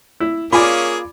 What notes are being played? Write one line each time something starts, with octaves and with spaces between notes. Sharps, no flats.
E4
A#3 C#4 F4 G#4 D5 G#5 B5